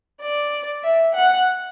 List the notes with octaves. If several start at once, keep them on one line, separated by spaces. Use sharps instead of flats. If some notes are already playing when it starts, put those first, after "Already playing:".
D5
E5
F#5